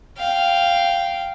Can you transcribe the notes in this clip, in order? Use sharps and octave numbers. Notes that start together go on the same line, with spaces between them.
F5 G5